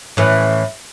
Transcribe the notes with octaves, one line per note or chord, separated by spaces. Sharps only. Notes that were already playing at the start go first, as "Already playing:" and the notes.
A2 E3 C#4